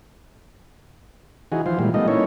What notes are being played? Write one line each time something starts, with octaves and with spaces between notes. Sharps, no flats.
E3 D#4 F#4 G#4
E3 F3 F4 C5
A#2 E3 G3 G#3
G3 A3 B3 D#4 F4 D#5
A3 A#3 C#4 D#4 E4 C#5